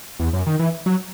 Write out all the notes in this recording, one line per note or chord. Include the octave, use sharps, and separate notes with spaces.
E2
F#2
D#3
E3
F#3